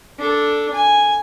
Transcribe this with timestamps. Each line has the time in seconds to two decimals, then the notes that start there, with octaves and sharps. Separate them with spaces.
0.19 D4 A4
0.73 G#5